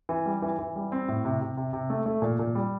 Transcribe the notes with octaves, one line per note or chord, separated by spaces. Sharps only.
E3
G3
E3
E3
G3
C4
A2
C3
C3
C3
C3
A3
A3
A#2
A#2
G3